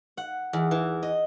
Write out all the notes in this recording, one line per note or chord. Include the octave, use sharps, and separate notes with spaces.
F#5
E2
E3
D#5